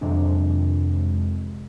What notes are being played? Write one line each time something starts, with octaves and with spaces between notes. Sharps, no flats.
F2 C3 D#3 F#3 G#3 D4